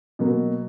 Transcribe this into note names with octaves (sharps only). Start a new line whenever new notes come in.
B2 F#3 A#3